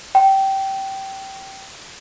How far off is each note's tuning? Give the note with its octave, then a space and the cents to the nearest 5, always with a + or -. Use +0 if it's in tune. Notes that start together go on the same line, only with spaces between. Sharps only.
G5 -20